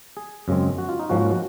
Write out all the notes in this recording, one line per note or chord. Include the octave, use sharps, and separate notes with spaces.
G#4
F#2 C#3 G#3 C4
F#4
F4
D#4
G#2 F3 A#3 C#4 F#4
F#4
F#4